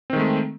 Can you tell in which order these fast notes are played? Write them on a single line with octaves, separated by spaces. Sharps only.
C4 D#3 G#3 A3